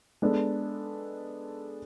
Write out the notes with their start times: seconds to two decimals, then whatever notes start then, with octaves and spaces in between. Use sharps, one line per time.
0.22 G#3 B3 D4 A4